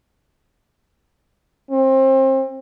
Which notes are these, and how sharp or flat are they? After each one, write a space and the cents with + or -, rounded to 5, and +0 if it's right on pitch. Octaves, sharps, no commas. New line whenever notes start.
C4 +30